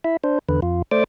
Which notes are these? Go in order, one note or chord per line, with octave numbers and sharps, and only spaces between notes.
E4 E5
D4 C5
E2 D3 B4
F2 F4
A3 C5 D5 D6